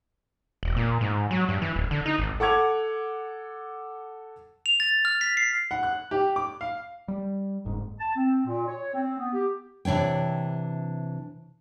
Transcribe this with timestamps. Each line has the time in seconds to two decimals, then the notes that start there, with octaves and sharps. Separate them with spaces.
0.63 E1
0.76 A#2
1.01 G#2
1.31 F#3
1.49 G2
1.62 E3
1.76 D#1
1.91 D3
2.06 D#4
2.18 G#1
2.40 A4 F#5 D6 G#6 F7
4.66 F7
4.80 A6
5.05 F6
5.21 B6
5.37 C7
5.71 F#5
5.83 F#6
6.11 G4
6.36 D6
6.61 F5
7.08 G3
7.65 F#1 G#2
7.99 A5
8.16 C4
8.45 A#2
8.67 C#5
8.93 C4
9.18 B3
9.33 G4
9.85 C3 E3 D4 C#5 G5